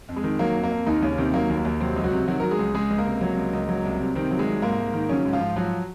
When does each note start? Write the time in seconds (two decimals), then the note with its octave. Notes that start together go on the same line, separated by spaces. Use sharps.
0.09 F2
0.16 G#3
0.24 D#3
0.39 F#3 A#3
0.55 F2
0.63 A#3
0.71 F2
0.86 D#2 D#3 D#4
1.02 D#2 C#3 C#4
1.18 C3 D#3 C4
1.33 F#3 A#3
1.49 D#2
1.57 A#3
1.65 D#2
1.80 C3 F#3 C4
1.96 C#2
2.04 F#3 F#4
2.12 C3
2.28 D#3 F#3 F#4
2.40 F#3 A#4
2.51 G#3 G#4
2.59 C#2
2.74 C#2 G#3 G#4
2.90 C#2
2.98 A#3 A#4
3.06 C3
3.21 F#3
3.37 C#2
3.53 C#2
3.69 F#3
3.85 C2
4.00 C3
4.15 C3 D#3 C4
4.31 F#3
4.39 G#3
4.47 C2
4.62 G#2 A#3
4.78 G#2
4.94 D#3
5.09 C#3 F#3 C#4
5.25 G#2
5.33 F3 F4
5.41 G#2
5.56 F3 F#3 F#4